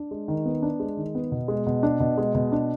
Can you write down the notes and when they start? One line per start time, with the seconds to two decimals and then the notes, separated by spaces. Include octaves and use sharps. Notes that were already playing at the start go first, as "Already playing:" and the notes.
Already playing: D4
0.11 G#3
0.28 D#3
0.45 B3
0.62 D4
0.80 G#3
0.97 D#3
1.15 B3
1.32 B2
1.48 G#3
1.67 B2
1.83 D4
2.00 B2
2.18 G#3
2.35 B2
2.52 D4